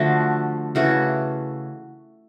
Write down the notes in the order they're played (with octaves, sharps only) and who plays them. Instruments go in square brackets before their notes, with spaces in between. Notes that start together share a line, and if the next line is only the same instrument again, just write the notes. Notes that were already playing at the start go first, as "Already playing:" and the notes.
Already playing: [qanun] D3 F3 A3 F#4
C#3 E3 A3 F#4